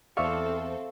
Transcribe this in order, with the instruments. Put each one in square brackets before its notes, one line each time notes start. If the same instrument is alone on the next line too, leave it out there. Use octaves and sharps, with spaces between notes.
[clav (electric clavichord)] E2 D5 [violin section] C4 A4 [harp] E5 F5 C#6